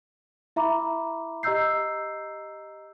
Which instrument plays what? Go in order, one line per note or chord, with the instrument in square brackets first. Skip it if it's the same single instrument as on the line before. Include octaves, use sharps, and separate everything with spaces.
[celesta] E4 E5 A#5 B5 D6
G4 D#5 A#5 E6 G6 C7